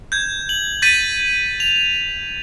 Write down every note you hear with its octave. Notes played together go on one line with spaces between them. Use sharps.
G6 G#6
F#7
G6 A6 B6 D#7
F7